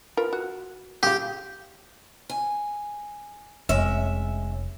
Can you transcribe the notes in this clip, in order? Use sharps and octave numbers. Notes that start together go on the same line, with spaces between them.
F4 A#4 B4
F#4
C#3 F4 G4
G#5
F1 G#3 C#4 E5